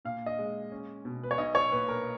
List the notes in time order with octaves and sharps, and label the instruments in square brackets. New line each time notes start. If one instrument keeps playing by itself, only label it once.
[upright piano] A#2 F5
D#5
G#3
C#4
B2
B4
C#5
B1 D#5
C#5
A#2 B4
A#4